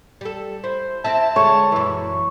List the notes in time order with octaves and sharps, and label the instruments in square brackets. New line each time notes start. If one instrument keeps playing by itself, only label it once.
[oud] G3 A4
[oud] E4 [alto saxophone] C5
[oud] C4 E4 E5 [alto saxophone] A5
[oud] D3 G#3 [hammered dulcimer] C#5
[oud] F#2 A#2 [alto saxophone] E3